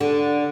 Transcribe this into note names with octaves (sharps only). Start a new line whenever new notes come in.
D3